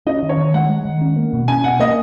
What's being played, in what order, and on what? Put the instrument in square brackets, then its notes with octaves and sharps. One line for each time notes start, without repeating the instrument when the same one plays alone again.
[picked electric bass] C#4 [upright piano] D#5
[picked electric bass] D#3
[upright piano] C#5
[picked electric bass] D#3
[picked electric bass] G#3 [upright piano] F#5
[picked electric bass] G#3
D#3
C#4
A#3
B2
[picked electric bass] C#4 [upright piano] G#5
[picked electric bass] B2 [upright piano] F#5
[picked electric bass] A#3 [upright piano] D#5